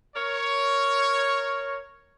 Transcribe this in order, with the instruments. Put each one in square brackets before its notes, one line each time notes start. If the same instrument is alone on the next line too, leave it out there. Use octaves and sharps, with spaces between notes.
[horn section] A#4 C#5